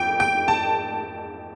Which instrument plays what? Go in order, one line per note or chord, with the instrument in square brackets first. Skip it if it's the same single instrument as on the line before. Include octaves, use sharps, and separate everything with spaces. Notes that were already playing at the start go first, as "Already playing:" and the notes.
Already playing: [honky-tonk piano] F2 G5
G5
A5